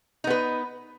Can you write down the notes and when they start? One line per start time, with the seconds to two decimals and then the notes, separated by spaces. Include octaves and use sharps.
0.24 D#4
0.27 B3
0.30 B4